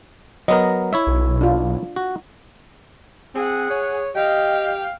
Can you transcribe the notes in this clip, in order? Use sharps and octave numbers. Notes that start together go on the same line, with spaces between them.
F#3 B3 A#4 D#5
E4 C#5 E5
B1
D4 F4
F#4
C4 G#4 F#5
C#5
G4 D#5 F5 G5